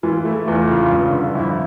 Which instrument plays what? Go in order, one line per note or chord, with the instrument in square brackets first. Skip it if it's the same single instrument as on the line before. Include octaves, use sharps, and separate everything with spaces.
[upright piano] E3 [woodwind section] F4
[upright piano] A3 [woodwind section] E4
[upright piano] E2 [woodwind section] F4
[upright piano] C#3
G2
D3
[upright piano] F2 [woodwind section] E4